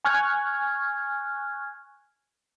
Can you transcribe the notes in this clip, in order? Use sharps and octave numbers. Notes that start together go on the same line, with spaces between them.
G#5 C#6 F6 F#6 G#6